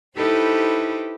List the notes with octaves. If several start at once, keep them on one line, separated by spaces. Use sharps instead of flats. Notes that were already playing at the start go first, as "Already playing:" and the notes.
D#4 E4 G4 A4 B4 C5